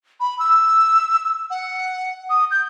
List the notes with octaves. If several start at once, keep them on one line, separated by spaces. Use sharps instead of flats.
B5
E6
F#5
D#6
G6